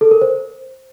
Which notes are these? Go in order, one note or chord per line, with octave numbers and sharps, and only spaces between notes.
A4
A#4
C5